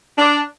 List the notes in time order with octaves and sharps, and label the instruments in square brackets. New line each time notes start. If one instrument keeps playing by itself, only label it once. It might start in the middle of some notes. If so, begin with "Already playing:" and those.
[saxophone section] D4